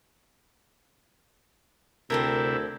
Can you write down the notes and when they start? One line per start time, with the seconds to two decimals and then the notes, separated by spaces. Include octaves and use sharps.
2.10 D2 C3 C4 E4 A4 A#4